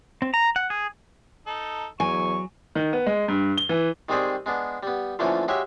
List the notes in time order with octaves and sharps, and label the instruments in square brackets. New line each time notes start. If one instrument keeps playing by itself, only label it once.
[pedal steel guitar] C4
A#5
F#5
G#4
[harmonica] D#4 A4
[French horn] E2 [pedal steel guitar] F#3 [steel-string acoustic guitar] G#5 [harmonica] C#6
[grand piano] D#3
B3
G#3
G2
G7
E3
[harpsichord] D#3 G3 G#3 C4 G#4 D5
G#3 B3 D4
G3 B3
D3 E3 F3 A3 A#3 C#4
G#3 F#4 G4 C#5 E5